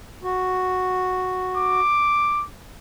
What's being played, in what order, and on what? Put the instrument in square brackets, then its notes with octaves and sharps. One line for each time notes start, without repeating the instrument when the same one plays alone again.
[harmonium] F#4
[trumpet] D6